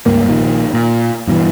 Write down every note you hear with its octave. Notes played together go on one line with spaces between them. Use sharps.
C#2 G2 A#3
A#1 A#2 D#3
A#2
G2 B2 D#3 E3